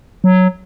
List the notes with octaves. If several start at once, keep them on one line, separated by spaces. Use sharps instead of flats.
F#3